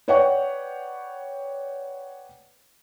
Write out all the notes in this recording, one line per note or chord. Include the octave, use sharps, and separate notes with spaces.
B4 C#5 D5 F#5 G5 C#6